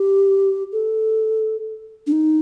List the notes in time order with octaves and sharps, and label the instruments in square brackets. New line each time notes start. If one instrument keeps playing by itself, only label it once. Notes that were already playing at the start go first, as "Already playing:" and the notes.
Already playing: [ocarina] G4
A4
D4
D#4